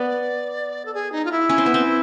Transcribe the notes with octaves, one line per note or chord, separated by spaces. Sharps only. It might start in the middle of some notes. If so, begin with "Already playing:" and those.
Already playing: B3 D5
A4
G#4
D#4
F4
E4
C#4
C4
B3
C4